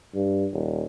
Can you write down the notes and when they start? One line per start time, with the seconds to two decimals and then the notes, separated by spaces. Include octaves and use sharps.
0.14 G2
0.52 D#1